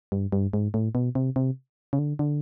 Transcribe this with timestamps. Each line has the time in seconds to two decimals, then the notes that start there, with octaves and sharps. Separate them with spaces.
0.12 G2
0.32 G2
0.53 G#2
0.74 A2
0.95 B2
1.15 C3
1.36 C3
1.93 C#3
1.99 D3
2.19 D3